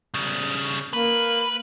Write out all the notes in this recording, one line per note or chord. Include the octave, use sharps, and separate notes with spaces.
C#3 G3
A#3 B4